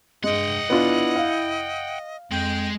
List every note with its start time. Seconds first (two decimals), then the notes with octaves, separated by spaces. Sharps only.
0.24 G2 G#3 D#5 F#5 G5
0.70 B3 D4 E4 F4
1.16 F5
2.31 F2 G#3 G5